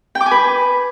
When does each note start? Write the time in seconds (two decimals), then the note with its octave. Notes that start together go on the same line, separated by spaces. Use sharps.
0.15 G5
0.21 D6
0.26 G#5
0.31 B4